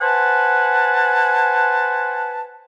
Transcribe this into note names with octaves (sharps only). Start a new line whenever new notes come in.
B4 C5 F#5 G#5 A5